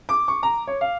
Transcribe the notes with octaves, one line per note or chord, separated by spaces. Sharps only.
D6
C#6
A#5
C#5
F5